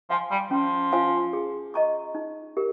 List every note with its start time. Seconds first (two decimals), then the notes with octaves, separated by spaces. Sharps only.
0.10 F3 F5 G#5 C6
0.31 G3
0.51 F3 C#4
0.92 F4 C5 F5 G#5
1.33 G#4
1.74 D#5 A#5 C#6
2.15 D#4
2.57 G4 A#4